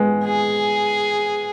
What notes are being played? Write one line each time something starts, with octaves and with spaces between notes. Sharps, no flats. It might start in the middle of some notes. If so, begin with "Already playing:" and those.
Already playing: G#3 B3
G#4